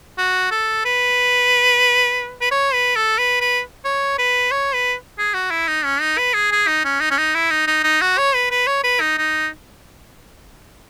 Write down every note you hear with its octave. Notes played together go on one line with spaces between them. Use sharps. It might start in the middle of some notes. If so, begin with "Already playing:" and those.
F#4
A4
B4
B4
C#5
B4
A4
B4
B4
C#5
B4
C#5
B4
G#4
F#4
E4
D#4
C#4
D#4
B4
G#4
G#4
D#4
C#4
D#4
C#4
D#4
E4
D#4
D#4
D#4
F#4
C#5
B4
B4
C#5
B4
D#4
D#4